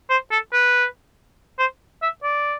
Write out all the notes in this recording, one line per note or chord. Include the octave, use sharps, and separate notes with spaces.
C5
A4
B4
C5
E5
D5